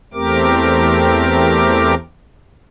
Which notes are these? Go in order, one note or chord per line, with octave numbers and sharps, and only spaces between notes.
E2 A3 C4 G4 A#4 D6